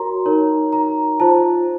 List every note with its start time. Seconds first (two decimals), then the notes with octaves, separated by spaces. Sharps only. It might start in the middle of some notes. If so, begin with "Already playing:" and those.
Already playing: F#4 A#4 C#5 A#5 C6
0.26 D#4 A#4 C#5
0.73 A#5
1.20 F4 C5 A5